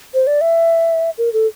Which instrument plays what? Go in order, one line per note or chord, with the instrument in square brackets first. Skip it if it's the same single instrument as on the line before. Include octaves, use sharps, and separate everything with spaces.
[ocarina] C5
D5
E5
A#4
A4